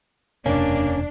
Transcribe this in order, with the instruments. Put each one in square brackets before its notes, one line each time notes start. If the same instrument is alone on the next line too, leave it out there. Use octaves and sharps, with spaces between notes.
[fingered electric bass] E1 F#2 C3 [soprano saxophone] A#3 [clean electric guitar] C#4 [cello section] D4